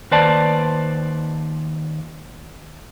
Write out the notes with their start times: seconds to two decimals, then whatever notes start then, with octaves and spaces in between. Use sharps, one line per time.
0.11 D#2 B4 C5 D5 A5